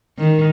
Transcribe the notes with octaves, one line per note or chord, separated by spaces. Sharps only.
D#3